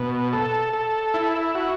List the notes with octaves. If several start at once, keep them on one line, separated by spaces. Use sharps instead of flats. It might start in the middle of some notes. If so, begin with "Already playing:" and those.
Already playing: B2
A4
A4
E4
F#4